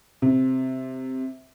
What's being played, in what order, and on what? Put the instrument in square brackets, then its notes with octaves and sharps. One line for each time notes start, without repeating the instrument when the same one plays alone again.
[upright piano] C3